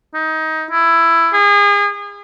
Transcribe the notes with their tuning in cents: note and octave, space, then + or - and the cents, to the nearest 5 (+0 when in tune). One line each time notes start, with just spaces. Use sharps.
D#4 +20
E4 +15
G#4 -35